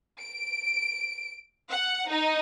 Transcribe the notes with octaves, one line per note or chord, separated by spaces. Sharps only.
D7
F#5
D#4